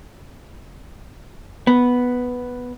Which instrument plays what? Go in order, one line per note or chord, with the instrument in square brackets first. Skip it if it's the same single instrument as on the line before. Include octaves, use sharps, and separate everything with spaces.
[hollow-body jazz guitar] B3